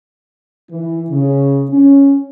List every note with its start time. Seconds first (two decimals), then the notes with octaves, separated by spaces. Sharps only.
0.69 E3
1.10 C#3
1.69 C#4